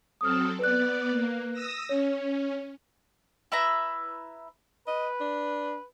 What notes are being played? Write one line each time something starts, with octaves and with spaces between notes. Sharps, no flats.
F#3 C4 A4 D#6 F6
B3 B4 D5 F#6
A#3
D#6 E6 A#6
C#4 C#5
E4 B4 E5 A#5
B4 D#5
D4